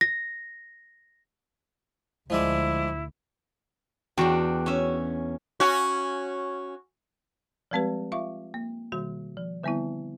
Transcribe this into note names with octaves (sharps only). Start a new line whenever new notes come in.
A#6
D2 F3 G#3 E4 D5
E2 D4 F#4 G5
C#4 E5
C#4 F#4
F3 G3 G#3 C4 G4 B4
F4 E5 F5 C#6
A#3
B2 D#3 G3 F#4
F3
D3 G3 B3 C4 E4